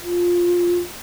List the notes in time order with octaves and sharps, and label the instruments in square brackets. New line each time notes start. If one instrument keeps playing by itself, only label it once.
[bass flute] F4